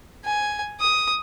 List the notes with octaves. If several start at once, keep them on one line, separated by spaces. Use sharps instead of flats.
G#5
D#6